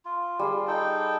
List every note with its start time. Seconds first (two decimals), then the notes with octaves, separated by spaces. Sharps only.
0.05 F4
0.39 G3 G#4 F5
0.68 D#4 A4 G5